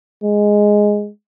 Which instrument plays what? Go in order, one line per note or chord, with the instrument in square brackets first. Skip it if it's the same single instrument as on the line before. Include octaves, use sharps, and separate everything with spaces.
[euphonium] G#3